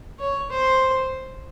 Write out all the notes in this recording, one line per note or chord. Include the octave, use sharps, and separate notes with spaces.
C#5
C5